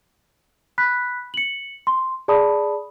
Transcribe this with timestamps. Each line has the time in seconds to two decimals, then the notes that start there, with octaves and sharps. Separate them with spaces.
0.78 B5 F#6 B6
1.34 C#7 F#7
1.87 C6
2.28 G#4 D5 A5 B5 D#6